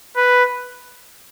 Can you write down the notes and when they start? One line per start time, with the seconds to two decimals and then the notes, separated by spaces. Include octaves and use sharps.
0.16 B4